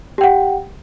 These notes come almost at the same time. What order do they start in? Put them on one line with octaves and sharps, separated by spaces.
G4 G5 F#5